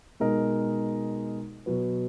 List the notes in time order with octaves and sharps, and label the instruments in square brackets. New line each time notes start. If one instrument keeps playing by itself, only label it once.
[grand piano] B2 G#3 D#4 A#4 D#5
B2 F#3 B3 F#4 B4